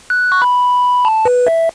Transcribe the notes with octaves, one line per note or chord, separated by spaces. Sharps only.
F#6
C#6
B5
A5
B4
E5